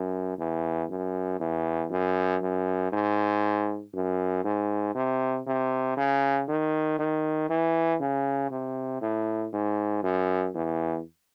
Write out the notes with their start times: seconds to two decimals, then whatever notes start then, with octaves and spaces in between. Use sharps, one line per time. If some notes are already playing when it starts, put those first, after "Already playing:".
Already playing: F#2
0.38 E2
0.90 F#2
1.40 E2
1.91 F#2
2.41 F#2
2.92 G#2
3.94 F#2
4.44 G#2
4.95 C3
5.47 C3
5.97 C#3
6.48 D#3
6.99 D#3
7.49 E3
8.01 C#3
8.51 C3
9.02 A2
9.53 G#2
10.03 F#2
10.55 E2